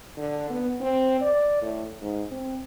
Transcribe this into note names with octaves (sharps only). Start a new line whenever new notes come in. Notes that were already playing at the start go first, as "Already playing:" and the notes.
D3
B3
C4
D5
A2
G#2
C4